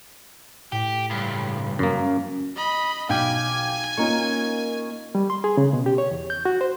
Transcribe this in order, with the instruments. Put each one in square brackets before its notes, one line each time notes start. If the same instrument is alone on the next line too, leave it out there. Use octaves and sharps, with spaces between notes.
[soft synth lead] A2 [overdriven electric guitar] G4
[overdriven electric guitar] C#2 G2
[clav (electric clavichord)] F#2 A#3 [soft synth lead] C#4
[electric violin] D#5 B5
[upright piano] B1 [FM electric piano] F5 G5 D6 [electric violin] G#5
[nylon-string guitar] A#3 [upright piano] C#4 D#4 F4 [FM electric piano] A#4 C#6
[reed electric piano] G3
C6
G#4
C#3
B2
G4
C#5
E2
G6
F#4
C5